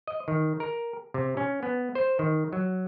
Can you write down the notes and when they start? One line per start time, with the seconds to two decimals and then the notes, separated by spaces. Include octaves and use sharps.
0.07 D#5
0.28 D#3
0.60 A#4
1.14 C3
1.37 C#4
1.63 B3
1.95 C5
2.19 D#3
2.53 F#3